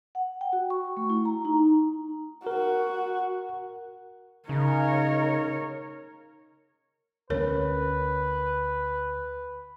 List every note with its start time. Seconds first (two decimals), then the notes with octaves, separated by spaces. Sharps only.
0.15 F#5
0.41 G5
0.53 F#4
0.70 C#6
0.97 A3
1.10 E4
1.25 A#5
1.45 D#4
2.47 F#4 A#4
4.49 C#3 D#4 A#4 C#5
7.30 D2 A3 C#4 A#4 B4 C#5